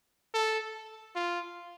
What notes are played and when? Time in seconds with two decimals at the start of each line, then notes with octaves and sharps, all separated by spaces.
0.34 A4
1.15 F4